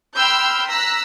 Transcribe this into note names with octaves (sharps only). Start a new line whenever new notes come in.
G5 B5 C6 E6 F6 G6
A#5 E6 F#6 B6